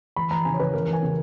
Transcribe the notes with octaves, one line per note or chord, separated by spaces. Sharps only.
E3 B5
E3 A#5
C#3 G#5
C#5
C#3 B4
E3 A#4
E3
G#5
C#3